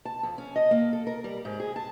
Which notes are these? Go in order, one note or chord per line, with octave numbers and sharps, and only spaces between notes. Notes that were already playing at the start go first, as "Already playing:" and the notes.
A5
F2
C#4
D#5
A#3
A4
A#4
G3
G#2
G#4
A5